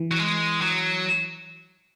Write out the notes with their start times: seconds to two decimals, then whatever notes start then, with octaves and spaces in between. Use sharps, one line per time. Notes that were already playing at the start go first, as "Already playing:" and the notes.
Already playing: E3
0.11 F#3
0.18 G#3
0.61 F#3